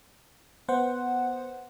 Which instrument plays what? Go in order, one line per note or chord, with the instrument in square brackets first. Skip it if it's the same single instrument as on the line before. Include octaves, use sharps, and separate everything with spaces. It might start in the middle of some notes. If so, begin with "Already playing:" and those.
[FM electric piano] B3 C5 F#5